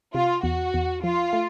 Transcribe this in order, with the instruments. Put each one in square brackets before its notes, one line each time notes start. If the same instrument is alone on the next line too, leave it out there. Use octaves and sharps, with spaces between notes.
[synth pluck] C3 [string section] F4
[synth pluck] E2 [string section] F#4
[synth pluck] E2
[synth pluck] F3 [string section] F4
[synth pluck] A3